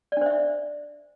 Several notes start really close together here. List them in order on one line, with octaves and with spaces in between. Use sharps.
D5 D4 C5 E5